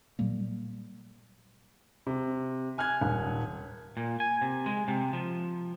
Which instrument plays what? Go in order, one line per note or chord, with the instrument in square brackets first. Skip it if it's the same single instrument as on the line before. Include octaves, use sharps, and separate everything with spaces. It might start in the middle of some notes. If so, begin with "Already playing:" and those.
[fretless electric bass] A#2 F#3 G3 A#3
[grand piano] C3
G#5 F6 F#6 G#6
D#1
[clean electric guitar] A#2
G#5
C3
G#3
C3
F3